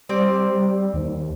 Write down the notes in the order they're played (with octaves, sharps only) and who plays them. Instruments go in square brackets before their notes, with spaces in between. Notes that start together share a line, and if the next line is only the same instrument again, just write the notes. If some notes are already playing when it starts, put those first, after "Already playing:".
[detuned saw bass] G3 [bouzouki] C4 C5 D5
[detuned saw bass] D#2